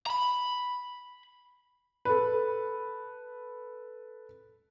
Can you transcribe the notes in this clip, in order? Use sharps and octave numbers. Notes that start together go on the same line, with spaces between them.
A#5 B5
A4 B4